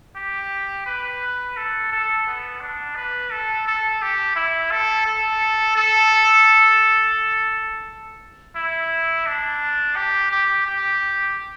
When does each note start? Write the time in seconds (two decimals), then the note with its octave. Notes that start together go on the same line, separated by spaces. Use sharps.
0.16 G4
0.86 B4
1.57 A4
1.92 A4
2.27 B3
2.61 D4
2.96 B4
3.31 A4
3.67 A4
4.02 G4
4.36 E4
4.71 A4
5.06 A4
5.76 A4
8.56 E4
9.27 D4
9.96 G4
10.31 G4
10.66 G4